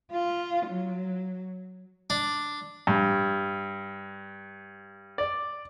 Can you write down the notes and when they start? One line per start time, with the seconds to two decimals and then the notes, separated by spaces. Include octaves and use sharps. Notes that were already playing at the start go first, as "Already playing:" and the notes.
0.13 F4
0.66 F#3
2.10 D4
2.87 G2
5.18 D5